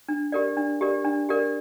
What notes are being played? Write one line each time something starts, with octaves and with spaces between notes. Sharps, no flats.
D4
G4 A#4 D5
D4
G4 A#4 D5
D4
G4 A#4 D5